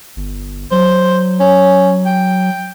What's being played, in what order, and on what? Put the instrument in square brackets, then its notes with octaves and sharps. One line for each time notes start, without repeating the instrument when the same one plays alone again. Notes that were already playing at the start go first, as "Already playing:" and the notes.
[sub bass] G1
[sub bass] F#3 [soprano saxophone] C5
[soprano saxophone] C#4
G5